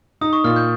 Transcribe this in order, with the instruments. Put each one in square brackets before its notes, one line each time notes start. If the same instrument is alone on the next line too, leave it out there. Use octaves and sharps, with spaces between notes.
[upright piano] D#4 [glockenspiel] D#6
[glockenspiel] C#6
[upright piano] A#2 [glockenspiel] F6
[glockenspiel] G6